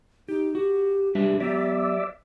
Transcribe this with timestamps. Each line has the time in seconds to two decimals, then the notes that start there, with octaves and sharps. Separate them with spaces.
0.29 D#4 G4
0.55 F#4 G4
1.15 G3 D4 G4 B4 E5
1.40 F#3 B3 G4 D5 E5